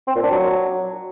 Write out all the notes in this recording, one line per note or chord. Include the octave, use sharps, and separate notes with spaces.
C4
A#2
D4
F#3